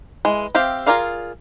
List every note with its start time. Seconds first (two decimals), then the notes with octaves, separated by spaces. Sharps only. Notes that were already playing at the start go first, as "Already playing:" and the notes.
0.25 E3 G#3
0.55 C4 G4 E5 F5
0.86 F4 G#4 A#4 D5 F5